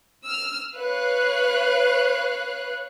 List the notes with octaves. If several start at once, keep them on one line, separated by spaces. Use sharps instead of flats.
E6 F6
B4 C#5 F5 F#6